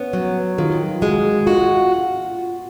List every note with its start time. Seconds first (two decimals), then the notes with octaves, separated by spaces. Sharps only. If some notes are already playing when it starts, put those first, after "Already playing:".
Already playing: B3 C#4
0.13 F#3
0.58 D#3 F4
1.02 G#3 F#4
1.46 F4 F#4